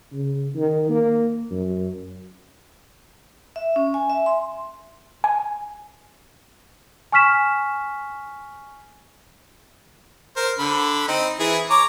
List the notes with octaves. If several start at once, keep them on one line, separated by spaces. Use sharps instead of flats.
C#3
D#3
A#3
F#2
E5
C#4
G#5
E5
C6
G#5
G#5 C#6 F6 B6 E7
A#4 C5
D3 B5
C4 D#4
E3 E4 G#4
C#5 A#5 D6